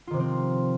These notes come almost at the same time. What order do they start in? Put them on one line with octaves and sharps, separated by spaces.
F4 D#3 C3 F3 C4